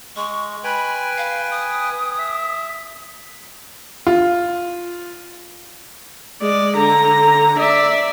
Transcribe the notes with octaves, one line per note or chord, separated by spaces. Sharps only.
G#3 C#6
B4 G5 G#5 B5
F5
D#6
E5
F4
G#3 D5
D3 A#5
D5 E5